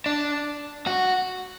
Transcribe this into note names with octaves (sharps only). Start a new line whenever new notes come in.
D4
F#4